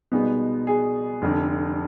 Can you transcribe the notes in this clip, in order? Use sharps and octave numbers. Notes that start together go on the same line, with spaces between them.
C2 B2 G#3 B3 D#4
G#4
F1 F2 D3